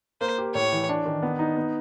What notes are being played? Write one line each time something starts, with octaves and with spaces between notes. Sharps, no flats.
A#3 C5
G4
A2 C#5
E3
D4
D#3
B3
D#4
B3